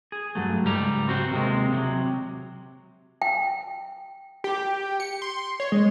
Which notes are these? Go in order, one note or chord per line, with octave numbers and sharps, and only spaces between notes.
G#4
G2 F#3 A3
C#2 G#2 G3 A#5
C4 F#4 C5
D#2 C3 G#3
C3 F3 F#3
G5
G4
C#7
C6
C#5
G#3